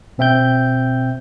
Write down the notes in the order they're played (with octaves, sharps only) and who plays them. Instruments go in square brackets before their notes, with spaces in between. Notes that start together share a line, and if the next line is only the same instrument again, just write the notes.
[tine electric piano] B2 C4 E5 G5 G6